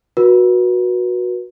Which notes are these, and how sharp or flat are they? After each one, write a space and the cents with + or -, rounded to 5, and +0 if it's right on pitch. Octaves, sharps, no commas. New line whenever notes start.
F#4 -15 B4 -35